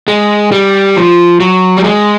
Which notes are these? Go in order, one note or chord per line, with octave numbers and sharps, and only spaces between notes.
G#3
G3
F3
F#3
G3
G#3